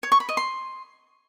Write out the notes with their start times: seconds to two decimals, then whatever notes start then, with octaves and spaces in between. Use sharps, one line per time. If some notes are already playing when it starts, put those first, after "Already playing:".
0.03 C#5
0.12 C#6
0.20 B5
0.29 D#5
0.37 C6